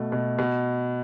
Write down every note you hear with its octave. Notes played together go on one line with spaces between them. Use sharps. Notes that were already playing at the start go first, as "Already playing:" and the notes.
Already playing: B2 A3
B2
B2